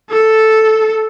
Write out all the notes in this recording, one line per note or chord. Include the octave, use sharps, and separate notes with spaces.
A4